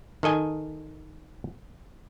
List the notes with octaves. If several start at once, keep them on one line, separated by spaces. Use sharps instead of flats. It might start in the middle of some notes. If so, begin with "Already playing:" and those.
D#3 A4 D#5 G#5